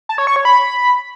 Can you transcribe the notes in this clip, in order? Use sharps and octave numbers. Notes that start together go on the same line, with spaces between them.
A5
C#5
C#6
C#5
B5